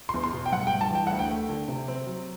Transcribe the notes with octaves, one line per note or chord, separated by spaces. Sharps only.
E2 C6
C6
B2
G5
G2 F#5
G5
G2
A5
E3 G5
D2 F#5
G5
A3
D3
C3
C4
F#3